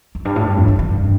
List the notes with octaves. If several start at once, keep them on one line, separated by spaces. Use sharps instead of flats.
F2
G2
A2
G2
F2
D#3
D#3
G2